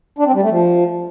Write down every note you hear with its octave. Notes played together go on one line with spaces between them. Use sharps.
D4
C4
G3
A3
F3